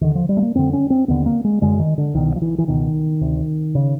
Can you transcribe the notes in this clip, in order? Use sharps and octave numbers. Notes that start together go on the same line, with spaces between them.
D#2 D3 D#3
F3
G3
A3
A#3
F2 D3 C4
C#4
C4
D#2 D3 B3
A#3
G#3
F#2 D3 G#3
D#3
D3
C2 B2 D#3
F3
E3
E3
C#2 B2 D#3
D2 C3
C#3